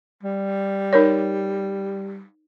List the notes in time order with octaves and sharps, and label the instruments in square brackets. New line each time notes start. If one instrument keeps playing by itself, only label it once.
[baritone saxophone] G3
[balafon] D#4 A#4 C#5